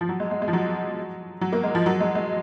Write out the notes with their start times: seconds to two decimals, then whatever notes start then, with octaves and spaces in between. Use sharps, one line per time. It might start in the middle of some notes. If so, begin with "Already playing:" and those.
0.01 F3
0.09 F#3
0.20 G#3
0.31 G#3
0.42 G#3
0.48 F3
0.53 F#3
1.41 F#3
1.53 A#3
1.63 G#3
1.75 F3
1.86 F#3
2.00 G#3
2.15 G#3